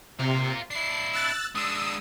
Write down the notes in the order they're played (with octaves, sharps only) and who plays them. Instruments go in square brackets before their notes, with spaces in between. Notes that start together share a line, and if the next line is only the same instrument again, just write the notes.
[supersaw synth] C3 [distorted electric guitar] F4 A#4
[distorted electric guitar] D4 E4 [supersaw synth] C7
[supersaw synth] E6 F#6 A6
[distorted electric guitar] G#3 D4 [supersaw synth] D#6 E6